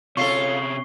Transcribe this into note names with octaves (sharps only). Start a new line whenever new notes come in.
C3 C#4 F4 A4 C#5 C#6 C7 G7